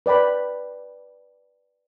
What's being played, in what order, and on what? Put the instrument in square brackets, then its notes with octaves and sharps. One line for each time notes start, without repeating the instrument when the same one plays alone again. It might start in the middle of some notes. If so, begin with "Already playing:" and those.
[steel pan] B4 D5 G5 B5